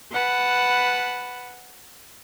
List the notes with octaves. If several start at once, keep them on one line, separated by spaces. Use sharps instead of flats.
B4 F#5 A5 B5